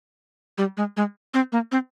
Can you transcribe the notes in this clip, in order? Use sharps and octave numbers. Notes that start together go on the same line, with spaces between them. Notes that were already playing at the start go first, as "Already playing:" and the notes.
G3
G#3
G#3
C4
A#3
C4